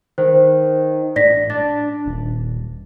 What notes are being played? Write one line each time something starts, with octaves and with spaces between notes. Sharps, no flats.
D#3 C5
A1 D5 A#6 B6
D4 A6
D#1